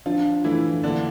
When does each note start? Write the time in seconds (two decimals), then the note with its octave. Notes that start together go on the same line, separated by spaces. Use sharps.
0.06 F3 D4 F4
0.44 E3 A3 E4
0.83 D3 A#3 D4